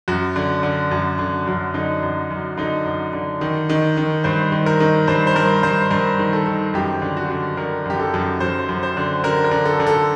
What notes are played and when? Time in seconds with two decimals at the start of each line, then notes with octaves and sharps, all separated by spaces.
0.08 F#2 F#4
0.36 D3
0.63 D3
0.91 F#2
1.19 D3
1.47 F#2
1.74 D3 D#4
2.03 F#2
2.30 F#2
2.57 D3 D#4
2.85 F#2
3.13 D3
3.41 D#3
3.69 D#3
3.97 D#3
4.24 G2 C5
4.52 D#3
4.66 A#4
4.80 D#3
5.08 G2 C5
5.27 C5
5.35 G2 A#4
5.63 G2 C5
5.90 G2 A#4
6.19 D#3
6.33 A4
6.46 D#3
6.74 F#2 G4
7.02 D3
7.17 F#4
7.30 D3
7.57 D3 A#4
7.85 F#2 G4
8.00 A4
8.14 F#2
8.40 F#2 C5
8.69 F#2
8.83 C5
8.97 D3
9.24 D3 A#4
9.44 A#4
9.51 D3
9.65 A4
9.80 D3
9.87 A4